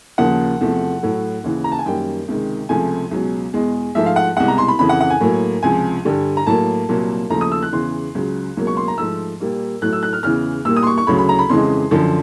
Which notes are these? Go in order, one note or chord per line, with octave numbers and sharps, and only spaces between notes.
D#2 C#3 F3 A#3 F#5
E2 C3 F3 A3
A2 F#3 A3
D#2 C#3 E3
A#5
A5
G#5
F#2 D#3 G3 A#3 G5
C#2 C3 D#3 G#3
C#2 C3 F3 A3 G#5
C#2 B2 F#3
E2 B2 G#3
G#2 F3 A3 E5
F5
F#5
C2 B2 G#3 F#5
A#5
C6
B5
F2 C#3 E3 B5
F#5
F#5
G#5
A2 F#3 A#3
C#2 C3 F3 G#5
G2 D3 G3
A#5
A2 F#3 A#3 A5
C2 A#2 F#3 A#3
D#2 C#3 F3 A3 A#5
D#6
E6
F#6
E2 C#3 E3 C6
C#2 C#3 F#3
C#2 B2 F#3 A#3
C#6
C6
A#5
G#2 F3 A3 E6
A#2 G3 A#3
A2 F#3 A3 F#6
E6
F#6
F6
E2 C#3 E3 F6
A#2 G3 A#3 E6
D#6
C6
C#6
C#6
D2 C#3 F#3 B5
B5
A#5
B5
F2 C#3 E3 G#3 C6
F#2 D3 F3